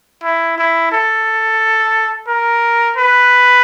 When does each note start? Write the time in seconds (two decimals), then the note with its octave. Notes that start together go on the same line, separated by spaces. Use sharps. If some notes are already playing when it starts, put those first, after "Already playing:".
0.24 E4
0.58 E4
0.92 A4
2.28 A#4
2.97 B4